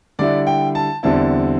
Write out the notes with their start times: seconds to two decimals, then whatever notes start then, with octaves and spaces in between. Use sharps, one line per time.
0.19 D3 G3 E4 D5
0.47 G5
0.75 A5
1.03 E2 D3 G3 C4 E4 A5